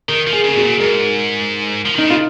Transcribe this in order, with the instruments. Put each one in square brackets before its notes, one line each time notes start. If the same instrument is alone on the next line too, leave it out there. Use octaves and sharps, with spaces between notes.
[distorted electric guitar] D#3 [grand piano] A#4
[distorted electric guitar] F3
[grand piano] G#4
[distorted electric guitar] C#3 [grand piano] G#4
[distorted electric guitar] B2 [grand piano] F#4
[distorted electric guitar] A#2
[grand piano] G#4
[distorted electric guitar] G#2 [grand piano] A#4
[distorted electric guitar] F3
[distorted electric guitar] D#3 [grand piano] D#4
[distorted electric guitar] C#3
[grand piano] F4